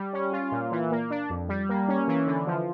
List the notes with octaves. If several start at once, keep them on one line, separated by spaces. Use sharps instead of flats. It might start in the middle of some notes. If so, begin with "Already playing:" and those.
Already playing: G3
C#4
F4
A#2
E3
A#3
D4
F2
G3
A#3
C#4
E3
D3
F3